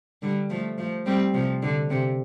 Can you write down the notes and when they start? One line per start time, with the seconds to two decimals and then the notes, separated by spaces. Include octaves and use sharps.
0.22 D3 G3
0.50 F3 A3
0.78 F3 A3
1.06 G3 C4
1.34 C3 F3
1.63 D3
1.90 C3